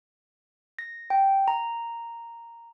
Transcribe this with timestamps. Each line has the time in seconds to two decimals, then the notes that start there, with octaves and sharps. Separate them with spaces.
0.79 A#6
1.10 G5
1.48 A#5